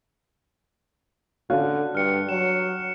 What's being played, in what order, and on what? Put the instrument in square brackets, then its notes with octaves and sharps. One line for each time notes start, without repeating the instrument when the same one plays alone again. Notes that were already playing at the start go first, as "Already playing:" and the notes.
[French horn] D3 [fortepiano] C#4 F#4 F5 [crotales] F#6
[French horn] G2 [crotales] F6 C#7
[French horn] F#3 [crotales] E7